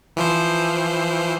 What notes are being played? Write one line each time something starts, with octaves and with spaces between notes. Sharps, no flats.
E3 F3 C5